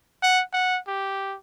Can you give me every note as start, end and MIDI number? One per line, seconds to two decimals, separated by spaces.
0.23 0.42 78
0.53 0.79 78
0.88 1.36 67